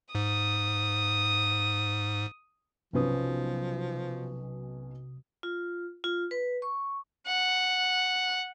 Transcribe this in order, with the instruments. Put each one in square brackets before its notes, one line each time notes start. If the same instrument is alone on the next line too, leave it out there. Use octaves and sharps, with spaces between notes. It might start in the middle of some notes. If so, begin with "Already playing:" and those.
[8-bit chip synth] G#2 [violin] D#6
[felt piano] B1 C#4 B4 [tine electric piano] C3 D#6 [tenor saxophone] F3
[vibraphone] F4
F4
B4
C#6
[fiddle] F#5